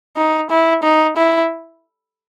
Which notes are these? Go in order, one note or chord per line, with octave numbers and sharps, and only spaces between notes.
D#4
E4
D#4
E4